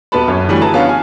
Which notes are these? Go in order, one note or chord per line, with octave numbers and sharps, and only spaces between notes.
D#1 B3 F#4 B4 A5 B5
F#2 C#5
D3 E3 G3 A3 C#4 F#4
E4 G#4 B4 A5 A#5
B3 C#4 D4 F4 C#5 F5
F5 G#5